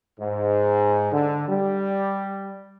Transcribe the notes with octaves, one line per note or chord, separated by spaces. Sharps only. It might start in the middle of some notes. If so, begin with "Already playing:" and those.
G#2
D3
G3